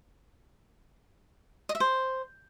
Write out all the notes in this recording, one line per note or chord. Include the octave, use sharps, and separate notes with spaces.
D#5
E5
C5